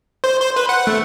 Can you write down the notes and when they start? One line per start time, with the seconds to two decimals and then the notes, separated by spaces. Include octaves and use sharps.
0.24 C5
0.41 C5
0.56 B4
0.69 F#5
0.87 A3